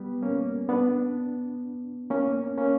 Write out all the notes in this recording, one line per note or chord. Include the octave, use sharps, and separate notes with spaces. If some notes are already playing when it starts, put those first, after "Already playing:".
Already playing: G3 B3
A#3 C#4
B3 D4
A#3 C#4
A#3 C#4